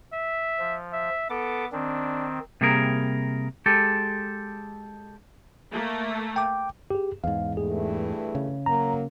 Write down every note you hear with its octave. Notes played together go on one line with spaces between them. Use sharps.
E5
F3
E5
B3 A4 D6
D#3 C4 D4
C3 G3 A#3 G#4 A#4
G#3 G4 A4
A3 A#3
G5 D6
G4 G#4
E2 G#2 F5
G2 E3 A3 G#4
C#3
F#3 A#3 A#5